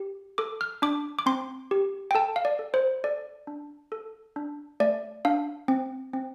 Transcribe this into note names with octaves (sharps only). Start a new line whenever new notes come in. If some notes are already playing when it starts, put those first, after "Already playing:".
Already playing: G4
A4 D6
F6
D4 D6
D6
C4 C6
G4
G5
A4 A5
F5
D5
A4
C5
A4 D5
D4
A4
D4
A3 D5
D4 F5
C4
C4